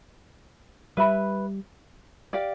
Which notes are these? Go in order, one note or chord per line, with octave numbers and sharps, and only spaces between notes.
G3 B4 E5 B5
G4 D5 F5